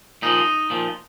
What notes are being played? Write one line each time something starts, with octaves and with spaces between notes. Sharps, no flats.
A#2 F3 D#4
A#2 F3